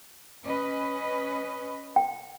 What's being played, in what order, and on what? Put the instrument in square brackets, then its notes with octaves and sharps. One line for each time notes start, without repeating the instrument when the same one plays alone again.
[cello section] C#4 B4 D#5
[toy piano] G5